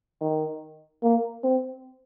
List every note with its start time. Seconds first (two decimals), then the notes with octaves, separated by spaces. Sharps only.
0.21 D#3
1.03 A#3
1.44 C4